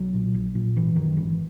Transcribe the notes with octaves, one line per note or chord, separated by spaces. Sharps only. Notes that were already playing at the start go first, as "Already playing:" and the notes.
Already playing: B1 F#3
A#2
A#1
A#2
G#1 E3
F#2 D#3
G#1 E3